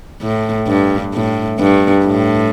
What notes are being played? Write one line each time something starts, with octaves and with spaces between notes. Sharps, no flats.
A2
G2
A2
G2
A2